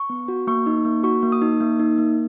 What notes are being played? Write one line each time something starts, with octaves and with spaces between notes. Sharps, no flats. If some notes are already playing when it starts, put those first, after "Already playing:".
Already playing: C#6
B3
F#4
A#3 C#6
D#4
A#3
F#4 C#6
A#3
D#6
D#4
A#3
D#4
A#3